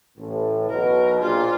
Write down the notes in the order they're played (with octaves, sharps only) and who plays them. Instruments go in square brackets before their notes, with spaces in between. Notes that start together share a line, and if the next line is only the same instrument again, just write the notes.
[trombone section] A1 A2
[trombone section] B1 B2 [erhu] A#4
[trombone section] A#1 A#2 [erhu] F4